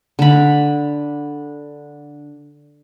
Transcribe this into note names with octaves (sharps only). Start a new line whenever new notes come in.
D3 B5